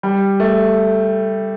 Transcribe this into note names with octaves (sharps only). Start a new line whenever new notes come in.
G3
A3